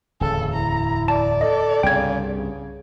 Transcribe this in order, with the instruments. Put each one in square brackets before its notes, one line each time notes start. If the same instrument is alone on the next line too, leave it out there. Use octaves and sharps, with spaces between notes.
[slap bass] D1 E2 [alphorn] C#3 [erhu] A4
[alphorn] E4 [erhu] A#5
[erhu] D5 [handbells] A5
[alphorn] A4 [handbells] D#5
[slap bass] C2 G2 [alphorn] C#3 [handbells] G5 G#6
[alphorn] C#3